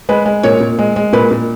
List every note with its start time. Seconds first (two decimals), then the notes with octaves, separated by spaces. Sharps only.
0.09 G#3 B4
0.26 G#3
0.43 A#2 C#5
0.60 A#2
0.79 G#3
0.96 G#3
1.13 A#2 B4
1.31 A#2